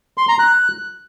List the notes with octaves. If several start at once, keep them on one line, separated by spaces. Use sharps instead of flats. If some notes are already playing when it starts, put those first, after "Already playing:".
C6
A#5
F#6